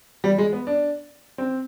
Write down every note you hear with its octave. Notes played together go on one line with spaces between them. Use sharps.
G3
G#3
B3
D4
C4